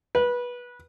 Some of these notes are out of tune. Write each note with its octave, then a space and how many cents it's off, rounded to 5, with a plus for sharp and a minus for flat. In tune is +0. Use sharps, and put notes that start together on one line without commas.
B4 -20